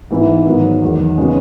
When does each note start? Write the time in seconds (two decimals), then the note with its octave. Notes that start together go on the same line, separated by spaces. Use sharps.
0.10 G#2 E3 B3 E4
0.45 G#2 D#3 F#3 B3
0.82 E2 D#3 F#3
1.18 C#3 G#3 B3 D#4 F#4